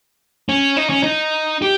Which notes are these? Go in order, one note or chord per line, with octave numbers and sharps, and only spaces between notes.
C#4
D#4
C#4
D#4
G4